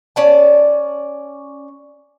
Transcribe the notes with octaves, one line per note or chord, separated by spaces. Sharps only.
C#4 D5 A5